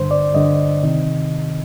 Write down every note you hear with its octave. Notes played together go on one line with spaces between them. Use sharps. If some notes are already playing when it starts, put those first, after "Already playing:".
Already playing: G2 D3 C5
D5
G2 D3 D#5
C3 D#3